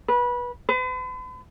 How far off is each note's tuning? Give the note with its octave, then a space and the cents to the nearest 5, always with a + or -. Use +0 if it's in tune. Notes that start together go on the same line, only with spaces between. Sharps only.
B4 -20
B4 +45